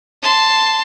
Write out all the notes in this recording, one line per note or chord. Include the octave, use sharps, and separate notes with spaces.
A5 C6